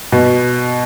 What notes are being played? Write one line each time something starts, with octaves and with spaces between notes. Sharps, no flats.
B2